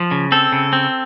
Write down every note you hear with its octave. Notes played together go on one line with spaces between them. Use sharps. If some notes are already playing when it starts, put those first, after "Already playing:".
Already playing: F3
C#3
C4 A4
C#3
C4